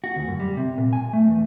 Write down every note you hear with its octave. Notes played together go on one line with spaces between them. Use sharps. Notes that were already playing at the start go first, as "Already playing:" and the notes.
F#4
D2
F#2
G3
C3
A#2
G#5
A3
E2